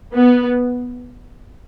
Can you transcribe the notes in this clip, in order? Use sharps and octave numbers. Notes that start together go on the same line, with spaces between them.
B3